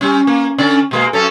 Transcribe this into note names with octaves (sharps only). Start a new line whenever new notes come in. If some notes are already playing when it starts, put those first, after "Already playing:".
G3 C#4
A#3
D3 C#4 D5
B2 G#3 A#3
F#2 C#4 A4